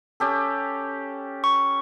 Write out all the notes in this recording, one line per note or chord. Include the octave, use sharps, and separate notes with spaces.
C#4 G4 A4
C#6